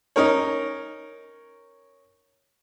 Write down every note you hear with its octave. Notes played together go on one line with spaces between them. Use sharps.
C#4 D#4 A#4 C#5